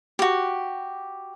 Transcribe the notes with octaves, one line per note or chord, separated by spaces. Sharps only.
F#4 G4